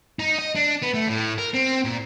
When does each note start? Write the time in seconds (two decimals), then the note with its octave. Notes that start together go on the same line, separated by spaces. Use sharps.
0.19 D#4
0.39 D#5
0.55 D4
0.82 B3
0.94 A3
1.08 A2
1.38 A#4
1.54 C4
1.85 A#2